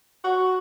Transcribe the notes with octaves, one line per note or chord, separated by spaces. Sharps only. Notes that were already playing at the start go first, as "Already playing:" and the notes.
F#4